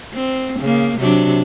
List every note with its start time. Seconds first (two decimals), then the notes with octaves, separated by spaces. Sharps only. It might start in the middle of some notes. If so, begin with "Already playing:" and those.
0.14 C4
0.60 C#3 A#3
0.99 C3 F#3 D4